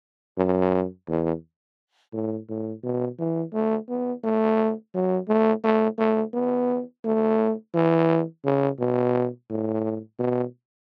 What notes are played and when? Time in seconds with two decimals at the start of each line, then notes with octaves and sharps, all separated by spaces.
0.38 F#2
1.08 E2
2.13 A2
2.49 A2
2.84 B2
3.19 E3
3.53 A3
3.89 B3
4.24 A3
4.94 F#3
5.28 A3
5.64 A3
5.99 A3
6.33 B3
7.05 A3
7.74 E3
8.45 C#3
8.79 B2
9.50 A2
10.19 B2